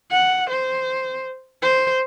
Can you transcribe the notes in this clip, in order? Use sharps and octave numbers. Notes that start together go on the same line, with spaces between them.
F#5
C5
C5